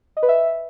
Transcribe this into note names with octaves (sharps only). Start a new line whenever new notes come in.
D#5
B4
E5